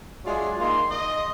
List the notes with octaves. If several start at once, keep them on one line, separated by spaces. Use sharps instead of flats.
F#3 G#3 D4 F4 G#4 E5
D#3 A#3 C6
D#5